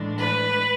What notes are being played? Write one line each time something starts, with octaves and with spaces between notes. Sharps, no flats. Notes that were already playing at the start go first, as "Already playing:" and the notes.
Already playing: A2 E3 G#3 D4
B4